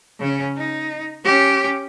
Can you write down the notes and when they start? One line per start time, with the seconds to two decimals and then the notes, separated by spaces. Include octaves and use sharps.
0.19 C#3 C#4
0.57 D#4
1.24 C#4 G4